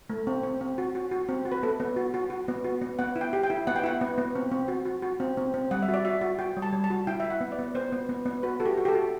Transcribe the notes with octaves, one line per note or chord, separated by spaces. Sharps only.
A3
C4
C4
C4
F#4
F#4
F#4
C4
F#4
B4
B3 A4
B3
F#4
F#4
F#4
B3
F#4
B3
B3 F#5
E4
G5
G4
G5
E4
B3 F#5
G5
E4 F#5
B3
B3
C4
C4
F#4
F#4
F#4
C4
C4
C4
G3 F#5
E5
F#4
D5
F#4 E5
F#4
F#4 G5
G3
A5
G3
A5
F#4
E4 G5
E4 E5
F#5
B3
D5
B3
B3 C5
B3
B3
B3
F#4 B4
F#4 A4
G4
F#4
G4
A4
F#4